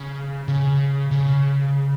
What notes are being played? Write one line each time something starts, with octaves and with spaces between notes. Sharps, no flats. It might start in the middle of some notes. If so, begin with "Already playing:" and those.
Already playing: C#3
C#3
C#3